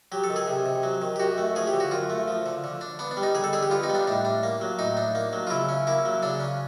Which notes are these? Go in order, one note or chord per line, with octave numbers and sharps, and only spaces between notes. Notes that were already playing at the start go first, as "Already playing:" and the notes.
F#3 G4
A4
D#3
G#4
C3
C3
F#3
D#3
G4
F#2 F#4
A3
F3 G#4
G4
D3
F#4
F#2 F4
A3
F3
D3
D3
D4
B3 D4
D4
G3
D#4
D3 G#4
A4
D4 G#4
G4
B3 F4
D#4
G3
D4
A2 D4
D4
A#3
F#3
A2 D#4
D4
A#3
F#3
F4
C#3 E4
C#4
A#3 E4
F#3
C#3 D4
C#4